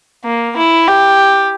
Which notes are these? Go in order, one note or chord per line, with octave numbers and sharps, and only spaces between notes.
A#3
E4
G4